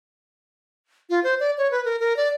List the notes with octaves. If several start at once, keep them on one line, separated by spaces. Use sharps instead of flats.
F4
C5
D5
C#5
B4
A#4
A#4
D5